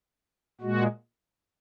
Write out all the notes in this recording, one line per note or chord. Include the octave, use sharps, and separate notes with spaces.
A#2 G#3 F#4